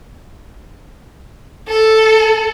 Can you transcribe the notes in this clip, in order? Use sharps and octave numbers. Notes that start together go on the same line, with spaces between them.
A4